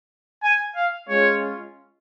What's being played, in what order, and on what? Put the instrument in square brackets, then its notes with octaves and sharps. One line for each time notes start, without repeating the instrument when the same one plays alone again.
[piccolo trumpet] G#5
F5
[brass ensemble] G#3 C#4 F4 [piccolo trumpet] C#5